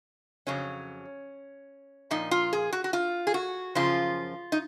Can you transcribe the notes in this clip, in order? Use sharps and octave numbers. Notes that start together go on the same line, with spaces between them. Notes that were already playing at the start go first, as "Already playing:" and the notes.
F2 C#3 F#3 C#4
A#2 F3 D#4
F4
G#4
F#4
F#4
F4
G#4
F#4
F#2 C#3 F3 F4
D#4